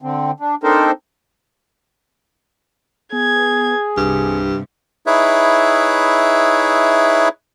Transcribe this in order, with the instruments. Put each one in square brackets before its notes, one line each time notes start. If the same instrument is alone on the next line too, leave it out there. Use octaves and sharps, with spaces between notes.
[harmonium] D3 C4
D4
C4 D4 D#4 A4 A#4 C5
[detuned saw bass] B3 [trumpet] G#4 [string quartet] G#6
[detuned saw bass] C2 [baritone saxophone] G2 [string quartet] C3
[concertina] D#4 E4 G#4 B4 C#5 E5